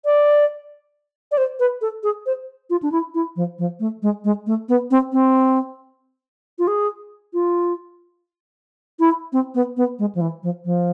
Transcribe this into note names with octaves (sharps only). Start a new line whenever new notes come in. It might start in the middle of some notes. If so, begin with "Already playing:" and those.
D5
D5
C5
B4
A4
G#4
C5
F4
D4
E4
E4
F3
F3
A3
G#3
G#3
A3
B3
C4
C4
F4
G#4
F4
E4
C4
B3
B3
G#3
F3
E3
F3
F3